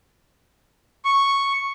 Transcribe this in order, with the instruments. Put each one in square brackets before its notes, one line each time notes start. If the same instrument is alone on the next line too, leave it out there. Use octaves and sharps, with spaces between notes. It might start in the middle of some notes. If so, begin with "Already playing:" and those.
[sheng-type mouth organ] C#6